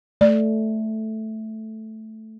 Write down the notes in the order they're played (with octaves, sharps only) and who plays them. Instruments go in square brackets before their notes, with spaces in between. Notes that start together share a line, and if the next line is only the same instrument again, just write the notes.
[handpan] A3 [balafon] D5